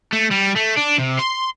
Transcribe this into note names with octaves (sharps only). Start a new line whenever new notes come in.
A3
G3
A3
D4
C3
C6